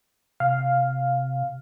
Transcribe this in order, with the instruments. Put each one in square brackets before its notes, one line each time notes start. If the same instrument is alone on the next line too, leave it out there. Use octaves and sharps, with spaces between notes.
[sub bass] C3 [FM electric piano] F5